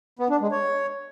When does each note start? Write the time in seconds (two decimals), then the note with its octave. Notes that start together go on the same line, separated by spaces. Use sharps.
0.19 B3
0.30 D4
0.41 G#3
0.52 C#5